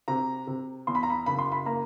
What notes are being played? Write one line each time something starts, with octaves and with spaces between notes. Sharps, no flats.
C3 A#5
C3
E2 C6
B5
A#5
B5
F#1 B5
C6
B5
A#3 A#5